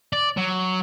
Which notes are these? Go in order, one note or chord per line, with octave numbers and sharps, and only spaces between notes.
D5
F#3